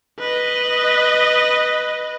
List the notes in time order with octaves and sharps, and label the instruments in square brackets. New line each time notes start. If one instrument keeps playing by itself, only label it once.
[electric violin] B4 D#5